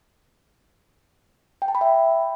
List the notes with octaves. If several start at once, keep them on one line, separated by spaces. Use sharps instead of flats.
G5
A5
B5
E5